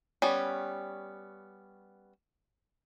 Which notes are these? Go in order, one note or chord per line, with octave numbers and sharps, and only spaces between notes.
G3 B3 C#4